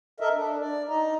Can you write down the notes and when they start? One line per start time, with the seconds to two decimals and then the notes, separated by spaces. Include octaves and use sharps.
0.20 A4 A#4 D#5 E5
0.34 D4
0.59 D5
0.89 D#4 D#5 A#5